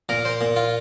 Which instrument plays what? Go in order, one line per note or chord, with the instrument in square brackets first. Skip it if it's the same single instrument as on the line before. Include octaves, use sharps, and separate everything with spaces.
[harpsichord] A#2 A#4
C5
A#2
F4